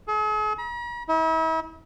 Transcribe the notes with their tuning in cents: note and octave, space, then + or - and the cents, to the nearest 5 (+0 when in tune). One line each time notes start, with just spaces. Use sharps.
G#4 +45
A#5 +45
E4 -40